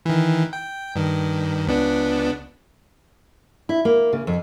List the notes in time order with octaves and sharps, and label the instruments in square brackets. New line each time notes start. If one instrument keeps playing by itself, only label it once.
[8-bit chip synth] D#3 E3
G5
G2 D#3
C#2 B3 D4
[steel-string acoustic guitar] E4
A#3
C#3
F2